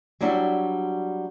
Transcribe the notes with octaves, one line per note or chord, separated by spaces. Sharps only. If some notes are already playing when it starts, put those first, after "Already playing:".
F#3 G3 D4 E4 F#4